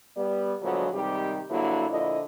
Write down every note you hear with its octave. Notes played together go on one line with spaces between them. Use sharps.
G3 B3 D5
A#2 D3 F3 F#3 G#3 B3
G#2 C3 D#3 G3 G4
G2 D3 F#3 A#3 E4
A#2 D3 F3 E4 D#5